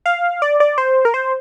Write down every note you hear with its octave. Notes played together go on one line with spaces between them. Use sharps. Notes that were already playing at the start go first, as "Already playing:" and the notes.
F5
D5
D5
C5
A#4
C5